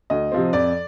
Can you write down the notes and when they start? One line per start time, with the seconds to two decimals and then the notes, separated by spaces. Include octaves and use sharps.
0.10 D2 D#5
0.32 C3 F3 C4
0.53 F2 D5